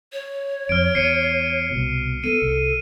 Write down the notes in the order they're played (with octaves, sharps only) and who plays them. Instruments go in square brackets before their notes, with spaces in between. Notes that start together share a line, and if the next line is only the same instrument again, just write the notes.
[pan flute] C#5
[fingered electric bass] F2 [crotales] F6 D7
[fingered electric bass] E2 [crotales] C7 C#7 D#7
[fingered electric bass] C2 B2
[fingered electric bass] B3 [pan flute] A4 [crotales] D#7
[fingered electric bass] C2